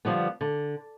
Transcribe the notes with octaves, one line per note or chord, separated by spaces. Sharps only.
D3 F3 G3 B3
D3